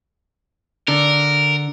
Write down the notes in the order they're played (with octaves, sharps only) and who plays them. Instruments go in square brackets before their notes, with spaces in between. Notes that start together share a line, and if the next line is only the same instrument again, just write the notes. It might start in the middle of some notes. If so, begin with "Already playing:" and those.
[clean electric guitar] D3 [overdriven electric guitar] A#4